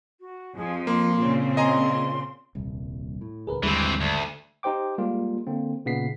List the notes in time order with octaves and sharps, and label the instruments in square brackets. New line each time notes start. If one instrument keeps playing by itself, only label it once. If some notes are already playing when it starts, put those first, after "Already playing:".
[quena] F#4
[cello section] F2 F3 [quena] G#4
[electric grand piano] A#3 [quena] C6
[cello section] A#2 C#3 C4
[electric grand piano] D#5 G#5 A#5 [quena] C6
[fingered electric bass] D#1 C2
A2
[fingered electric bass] D#1 D2 [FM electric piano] G#4 A#4 B4
[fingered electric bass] G#1 D3 G#3 [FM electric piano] D#2 G3 [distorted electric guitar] E3 C4
[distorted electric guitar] D2
[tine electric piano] D#4 G4 C5 G5 D6
G3 G#3 A#3 F4
D3 A#3 C4
A#2 C#3 B3 D#4 B6 C7